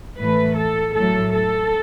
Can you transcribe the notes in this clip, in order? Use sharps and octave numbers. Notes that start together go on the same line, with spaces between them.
A2 E3 A3 B4
A4
A2 F#3 A3 A4
A4